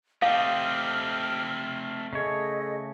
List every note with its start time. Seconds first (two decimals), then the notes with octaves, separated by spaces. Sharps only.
0.22 A3 C4 G4 D#5 F5 E6 F6
2.13 C#3 A3 G#4 A4 C#5 D#5